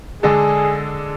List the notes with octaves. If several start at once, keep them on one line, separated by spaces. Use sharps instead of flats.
D3 G#3 D4 G#4 A4